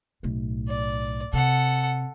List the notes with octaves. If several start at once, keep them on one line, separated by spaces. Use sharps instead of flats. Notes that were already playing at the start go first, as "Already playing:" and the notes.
B1 A2
D5
C3 A4 F#5